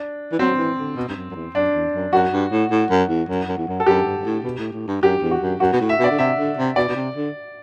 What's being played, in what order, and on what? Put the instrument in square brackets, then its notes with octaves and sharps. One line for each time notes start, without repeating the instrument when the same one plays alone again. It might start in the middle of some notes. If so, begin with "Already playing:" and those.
Already playing: [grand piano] D4
[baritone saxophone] E3
[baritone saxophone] F#3 [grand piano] C4
[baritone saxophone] E3
D3
B2
G2
F#2
F#2
E2
[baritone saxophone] F#2 [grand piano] D4
[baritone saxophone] E2
F#2
[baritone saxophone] F#2 [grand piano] F#4
[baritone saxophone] G2
A2
A2
F#2
E2
F#2
F#2
E2
F#2
[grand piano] A4
[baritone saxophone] F#2 [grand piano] G4
[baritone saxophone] G2
G2
A2
B2
A2
A2
G2
[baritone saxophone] F#2 [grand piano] G4
[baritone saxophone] E2
[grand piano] F#4
[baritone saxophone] F#2
[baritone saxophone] F#2 [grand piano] F#4
[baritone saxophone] B2
A2
[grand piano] E5
[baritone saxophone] B2 [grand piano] D5
[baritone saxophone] D3
[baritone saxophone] C3 [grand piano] E5
[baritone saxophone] D3
C3
[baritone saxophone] B2 [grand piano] D5
[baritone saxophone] B2
C3
D3